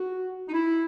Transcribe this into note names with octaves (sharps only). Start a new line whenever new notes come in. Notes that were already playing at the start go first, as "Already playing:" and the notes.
Already playing: F#4
D#4
E4